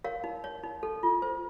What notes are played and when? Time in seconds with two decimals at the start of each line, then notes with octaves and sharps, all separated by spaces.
0.04 A#4 C#5 F5
0.24 D#4
0.44 C#5
0.63 D#4
0.83 A4
1.03 F4
1.22 C5